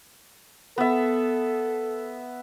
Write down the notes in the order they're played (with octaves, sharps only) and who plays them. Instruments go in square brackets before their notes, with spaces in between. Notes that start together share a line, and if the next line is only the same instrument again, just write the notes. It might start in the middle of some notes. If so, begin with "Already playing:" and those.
[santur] B3 E5 [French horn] A4